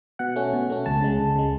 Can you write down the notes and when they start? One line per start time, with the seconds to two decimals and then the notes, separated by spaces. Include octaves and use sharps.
0.19 B2 F#5
0.36 A3 C#4
0.53 B2
0.70 A3 C#4
0.86 C#2 A5
1.02 C#3 G#3
1.20 C#2
1.35 C#3 G#3